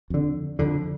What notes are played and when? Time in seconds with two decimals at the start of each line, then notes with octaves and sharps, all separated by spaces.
0.10 F2 D3
0.59 F2 D3